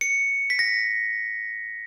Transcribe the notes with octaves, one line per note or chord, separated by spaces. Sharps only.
C#7
B6
A#6